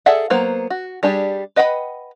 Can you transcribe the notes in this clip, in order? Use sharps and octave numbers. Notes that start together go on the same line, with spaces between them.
G#4 A4 D5 E5 F#5
F#3 A#3 B3 C5
F#4
G3 D4 G4 G#4
B4 D#5 F#5 G5 B5